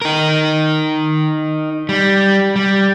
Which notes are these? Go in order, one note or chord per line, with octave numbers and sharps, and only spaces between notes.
D#4 A#4
G3
G3